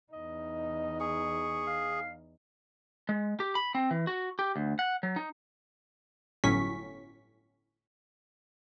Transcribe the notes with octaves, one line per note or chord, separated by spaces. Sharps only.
E2 D#4 D#5
G#4 C#6
F5
G#3
G4
B5
C4
E3
F#4
G4
D2
F#5
F#3
D#4
G1 A2 F#3 C#4 C#6 B6